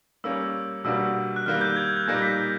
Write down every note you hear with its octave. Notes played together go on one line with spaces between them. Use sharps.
G3 A#3 C#4 E6
B2 G3 A#3 D4 F#4 E6
F#6
D#3 G3 A#3 F6
G6
G#6
G#6
A#2 G3 A#3 D#4 A#6
B6
B6